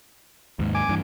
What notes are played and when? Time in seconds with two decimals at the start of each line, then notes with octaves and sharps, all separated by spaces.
0.59 D#2 G#2
0.75 G#5 D6
0.89 G2 E3